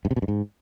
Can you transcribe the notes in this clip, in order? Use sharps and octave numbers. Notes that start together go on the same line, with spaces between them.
G2
C3
B2
G2
G#2